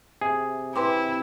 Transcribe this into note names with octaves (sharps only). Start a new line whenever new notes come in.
C3 G#4
C4 E4 B4 C6 D6